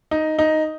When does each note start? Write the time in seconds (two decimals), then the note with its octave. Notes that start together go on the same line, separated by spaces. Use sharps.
0.11 D#4
0.39 D#4